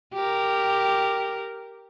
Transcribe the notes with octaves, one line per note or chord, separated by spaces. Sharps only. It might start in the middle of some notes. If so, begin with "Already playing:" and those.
G4 A#4